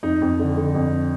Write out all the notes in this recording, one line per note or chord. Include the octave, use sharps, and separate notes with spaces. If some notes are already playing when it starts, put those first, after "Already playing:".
F2 D#4
F2
D3
D3
F2